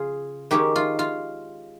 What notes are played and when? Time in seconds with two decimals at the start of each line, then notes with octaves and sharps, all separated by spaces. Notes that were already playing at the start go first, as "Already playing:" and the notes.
Already playing: C#3 F4 G#4
0.51 D#3 G#3 C#4 G4
0.76 F4
0.99 F4